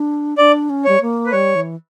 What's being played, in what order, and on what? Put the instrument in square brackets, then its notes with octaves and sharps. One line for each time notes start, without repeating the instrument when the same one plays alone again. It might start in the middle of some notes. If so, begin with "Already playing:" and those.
Already playing: [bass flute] D4
[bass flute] D4 [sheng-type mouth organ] D5
[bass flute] C#4
[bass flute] G3 [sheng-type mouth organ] C#5
[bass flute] A#3
[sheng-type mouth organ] B4
[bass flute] G3 [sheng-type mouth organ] C#5
[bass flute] E3